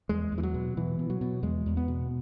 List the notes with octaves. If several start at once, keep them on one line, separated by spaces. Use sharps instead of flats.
E2 G#3
E2
E3
F#3
B2
B2 E3
B2
F#3
B2
E2 G#3
E2
B3
B2